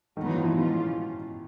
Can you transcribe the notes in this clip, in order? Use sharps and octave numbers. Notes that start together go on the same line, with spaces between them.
D#3 F#3 B3 D#4
E3
F3
E3
B2 G#3 C#4 F4